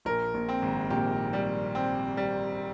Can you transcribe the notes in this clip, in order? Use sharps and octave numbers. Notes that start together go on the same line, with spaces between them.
A#1 A#2 A#4
A#1 A#2
C4
G#1 G#2
A#1 A#2 G4
G3
C4
G3